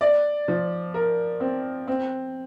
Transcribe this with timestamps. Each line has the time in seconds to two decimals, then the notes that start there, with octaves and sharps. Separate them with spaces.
0.01 D5
0.48 F3
0.94 A#4
1.40 C4
1.87 C4